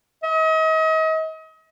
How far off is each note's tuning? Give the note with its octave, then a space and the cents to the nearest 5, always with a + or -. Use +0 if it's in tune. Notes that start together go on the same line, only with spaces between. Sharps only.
D#5 +40